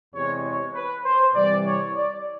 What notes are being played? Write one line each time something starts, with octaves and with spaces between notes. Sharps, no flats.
E2 C3 E3 G#3 C#5
C#5
B4
C5
C3 E3 G3 D5
C#5
D5